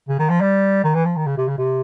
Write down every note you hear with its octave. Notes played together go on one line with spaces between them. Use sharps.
C#3
D#3
F3
G3
D#3
E3
F3
D#3
C#3
C3
C#3
C3